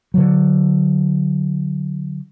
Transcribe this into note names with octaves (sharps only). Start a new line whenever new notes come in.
D3 F#3